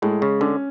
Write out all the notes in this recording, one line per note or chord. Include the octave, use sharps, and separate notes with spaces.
A2 G#3
C#3
D3 C#4